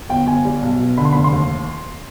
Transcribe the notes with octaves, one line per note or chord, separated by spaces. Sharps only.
G1 G5
G1 G#5
G3
B1
B2
D3 B5
C6
F1 B5
C6
D#2